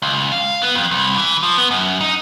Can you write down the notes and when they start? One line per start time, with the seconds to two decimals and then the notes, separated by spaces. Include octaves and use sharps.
0.02 C#2
0.32 F5
0.62 B3
0.75 F2
0.91 C2
1.17 E3
1.43 F3
1.58 B3
1.71 F#2
2.01 D#4